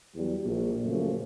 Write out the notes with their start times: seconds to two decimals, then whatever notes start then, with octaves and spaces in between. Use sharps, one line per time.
0.16 E2 F#3 G3
0.45 A#1
0.84 F#2 A#2 C#3 F3 A3